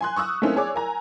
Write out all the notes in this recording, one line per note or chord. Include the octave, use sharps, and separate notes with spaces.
G#5 C6 F#6
C#6 D#6 E6 F#6
A3 A#3 C4 C#4 D#4
G#4 C#5 D5 D6
A#4 G#5 A#5